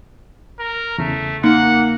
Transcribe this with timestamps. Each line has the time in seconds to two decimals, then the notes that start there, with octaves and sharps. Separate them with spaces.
0.59 A#4
0.98 E2 C#3 A3
1.43 A#3 D#4 F#5